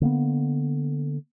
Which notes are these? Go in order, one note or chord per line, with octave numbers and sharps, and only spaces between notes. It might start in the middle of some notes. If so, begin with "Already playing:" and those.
D3 A#3 B3